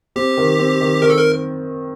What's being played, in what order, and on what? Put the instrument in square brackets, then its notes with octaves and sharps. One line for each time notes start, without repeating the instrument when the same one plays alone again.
[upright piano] C4 [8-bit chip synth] G4
[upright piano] D#3
C4
D#3
[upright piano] D#3 [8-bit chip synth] A#4
[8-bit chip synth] A4
A#4